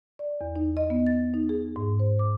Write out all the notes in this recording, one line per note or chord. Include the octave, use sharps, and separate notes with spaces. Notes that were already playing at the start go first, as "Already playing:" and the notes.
D5
E2
D#4
D#5
B3
A6
D#4
G#4
G#2
C5
D6